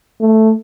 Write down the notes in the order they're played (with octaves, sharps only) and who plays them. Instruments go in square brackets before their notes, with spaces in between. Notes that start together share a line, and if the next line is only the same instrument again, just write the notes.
[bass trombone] A3